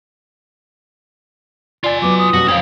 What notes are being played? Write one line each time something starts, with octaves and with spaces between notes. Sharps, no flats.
F4 D5 G#5
F#3 B3 D6
D#6
B2 G3 C#4 F#4
F2 C#4 F5 G5